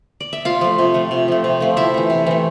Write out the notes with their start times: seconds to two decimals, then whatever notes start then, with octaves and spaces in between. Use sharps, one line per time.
0.21 D5
0.33 E5
0.45 C3 F4 F5
0.61 F3 A3
0.78 C3
0.94 F3 A3
1.11 C3
1.28 F3 A3
1.44 C3
1.60 F3 A3
1.76 C3 E4 E5
1.94 E3 A3
2.10 C3
2.26 E3 A3